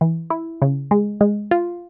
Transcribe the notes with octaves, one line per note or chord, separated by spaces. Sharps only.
E3
E4
C#3
G#3
G#3
F4